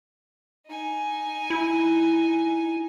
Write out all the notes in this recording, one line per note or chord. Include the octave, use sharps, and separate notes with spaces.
D#4 G#5
E4